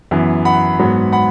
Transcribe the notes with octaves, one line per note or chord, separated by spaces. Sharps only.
F#2 E3 B3
F#5 B5
G#2 F#3 B3
F#5 B5